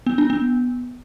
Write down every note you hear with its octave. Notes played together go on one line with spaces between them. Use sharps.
B3
D4
B3